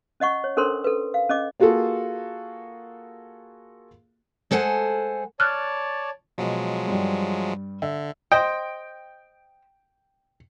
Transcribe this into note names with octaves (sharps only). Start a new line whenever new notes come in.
C#4 D#5 F#5 C#6
C#5
C#4 D4 A4 A#4 C5 C6
A4 B4
F5
C#4 D#5 D6
A#3 F4 F#4 G#4 A4
G#3 A4 C5 F#5 G#5
C#5 D5 A5 F6 F#6
B2 F3 F#3 G#3
G2 G3
D3 E5
C5 D#5 G5